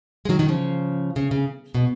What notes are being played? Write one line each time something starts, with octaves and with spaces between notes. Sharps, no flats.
G#3
D#3 F#3
D#3 F#3
C#3 F3
C#3
C#3
B2